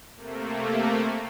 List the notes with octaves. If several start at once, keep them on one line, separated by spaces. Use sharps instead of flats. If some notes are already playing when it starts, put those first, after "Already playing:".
C3 A3 A#3